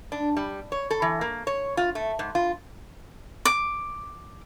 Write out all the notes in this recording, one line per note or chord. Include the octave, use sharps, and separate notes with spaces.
D4
G3
C#5
A4
E3
A#3
C#5
F4
A3
G#2
F4
D6